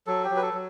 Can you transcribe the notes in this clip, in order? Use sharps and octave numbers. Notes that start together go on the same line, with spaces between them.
F#3 A4
G4
F#3
B4
A4
F#3